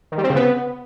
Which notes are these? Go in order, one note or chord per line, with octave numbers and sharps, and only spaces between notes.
D#3
G3
C4
C#3
B3